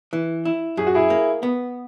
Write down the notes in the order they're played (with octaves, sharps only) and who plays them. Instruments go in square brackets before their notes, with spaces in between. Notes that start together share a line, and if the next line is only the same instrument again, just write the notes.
[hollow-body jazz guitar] E3
E4
[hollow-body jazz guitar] F#2 [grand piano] G#4
[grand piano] F#4
E4 G#4
[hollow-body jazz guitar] A#3
B3